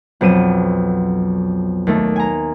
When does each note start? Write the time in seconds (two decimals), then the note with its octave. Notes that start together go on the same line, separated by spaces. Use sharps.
0.21 B1 F2 F#3 D#7 E7
1.87 D#2 A3
2.16 G#5 A#5